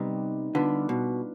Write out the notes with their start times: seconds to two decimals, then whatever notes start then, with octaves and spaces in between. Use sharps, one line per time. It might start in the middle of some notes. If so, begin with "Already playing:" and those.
Already playing: C3 G3 B3 D#4
0.55 D3 B3 D4 F4 B4
0.89 B2